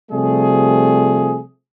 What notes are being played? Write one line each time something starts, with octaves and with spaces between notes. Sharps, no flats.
C3 F3 G3 A3 G#4